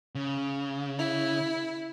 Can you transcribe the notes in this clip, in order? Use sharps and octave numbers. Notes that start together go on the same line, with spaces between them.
C#3
E4